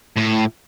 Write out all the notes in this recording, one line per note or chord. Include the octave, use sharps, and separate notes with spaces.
A2